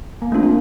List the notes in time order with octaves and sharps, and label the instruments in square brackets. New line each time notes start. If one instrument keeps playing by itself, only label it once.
[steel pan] A#3
[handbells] A3 D4 F4 [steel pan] C4
[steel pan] A#3